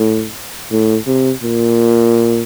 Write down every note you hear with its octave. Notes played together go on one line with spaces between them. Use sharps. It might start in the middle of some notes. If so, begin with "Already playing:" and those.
Already playing: A2
A2
C3
A#2